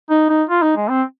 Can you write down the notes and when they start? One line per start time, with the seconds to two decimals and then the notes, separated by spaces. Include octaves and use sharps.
0.10 D#4
0.29 D#4
0.50 F4
0.62 D#4
0.76 G#3
0.88 C4